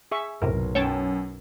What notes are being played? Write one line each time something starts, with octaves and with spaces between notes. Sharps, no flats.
G#4 E5 C#6
B1 F#2 A2 C3 A#4
F#2 C#5 G5 A5